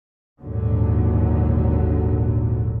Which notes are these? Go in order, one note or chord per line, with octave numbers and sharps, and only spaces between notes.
G#1 D#2 A#2 D3 F#3